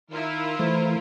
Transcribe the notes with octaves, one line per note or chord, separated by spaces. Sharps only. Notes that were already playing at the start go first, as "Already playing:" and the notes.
D#3 E4 F4 A#4
E3 A3 C5